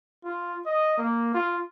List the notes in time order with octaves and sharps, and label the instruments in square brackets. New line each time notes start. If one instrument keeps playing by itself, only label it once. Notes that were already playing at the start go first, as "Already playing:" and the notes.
[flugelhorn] F4
D#5
A#3
F4